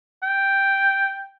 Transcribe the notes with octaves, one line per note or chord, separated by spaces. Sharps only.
G5